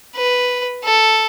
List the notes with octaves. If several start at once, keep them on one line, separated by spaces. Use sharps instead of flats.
B4
A4